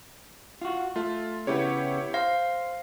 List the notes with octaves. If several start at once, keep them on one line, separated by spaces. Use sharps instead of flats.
F4 F#4
A3 F4
C#3 B3 E4 G4 C#5
C5 F5 A#6